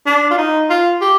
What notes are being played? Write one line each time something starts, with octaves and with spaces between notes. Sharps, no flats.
D4
F4
D#4
F4
G4